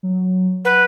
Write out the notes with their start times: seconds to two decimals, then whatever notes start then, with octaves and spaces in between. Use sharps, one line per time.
0.03 F#3
0.65 B4 F#5